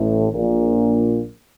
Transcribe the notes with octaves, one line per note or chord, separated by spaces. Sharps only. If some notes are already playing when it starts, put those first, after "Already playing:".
Already playing: A1 A2
A#1 A#2